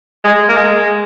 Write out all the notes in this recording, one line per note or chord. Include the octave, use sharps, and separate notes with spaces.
G#3
A#3
G#3